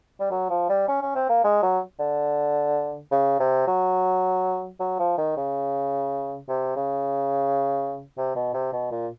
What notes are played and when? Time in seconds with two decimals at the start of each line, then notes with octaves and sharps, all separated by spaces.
0.20 G3
0.31 F#3
0.49 F3
0.69 G3
0.88 C#4
1.02 C#4
1.15 C4
1.29 A#3
1.44 G#3
1.62 F#3
1.99 D3
3.11 C#3
3.40 C3
3.68 F#3
4.80 F#3
4.99 F3
5.17 D#3
5.37 C#3
6.48 C3
6.76 C#3
8.17 C3
8.35 B2
8.54 C3
8.73 B2
8.91 A#2